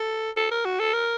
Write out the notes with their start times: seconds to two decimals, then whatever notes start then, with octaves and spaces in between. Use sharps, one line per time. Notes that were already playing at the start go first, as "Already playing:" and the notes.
Already playing: A4
0.37 A4
0.51 A#4
0.65 F#4
0.79 A4
0.93 A#4